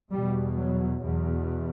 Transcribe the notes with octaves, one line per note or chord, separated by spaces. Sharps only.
E2 B2 G3
F#3
E2 B2